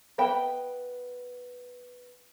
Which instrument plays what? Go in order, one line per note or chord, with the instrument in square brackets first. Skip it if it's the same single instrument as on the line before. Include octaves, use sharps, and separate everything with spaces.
[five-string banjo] B3 E5 G5 B5